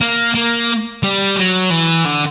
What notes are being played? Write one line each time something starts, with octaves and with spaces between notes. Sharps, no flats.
A#3
A#3
G3
F#3
E3
D3